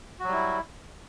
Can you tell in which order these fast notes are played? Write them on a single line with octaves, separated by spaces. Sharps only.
F#4 F#3 G3 E4